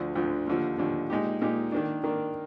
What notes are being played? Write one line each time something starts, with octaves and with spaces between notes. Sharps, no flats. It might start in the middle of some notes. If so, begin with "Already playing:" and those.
Already playing: D2 D3 F3
D2 D3 F3
D#2 D3 F3
D#2 D3 F3
A#2 G#3 D#4 G4
A#2 G#3 D#4 G4
D#3 A#3 D4
D#3 A#3 D4